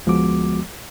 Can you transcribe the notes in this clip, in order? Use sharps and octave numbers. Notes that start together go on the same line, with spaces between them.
D2 F3 G#3 B3 F#4 D6